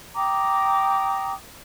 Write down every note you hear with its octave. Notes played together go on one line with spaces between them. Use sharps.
G5 A#5 D6 D#6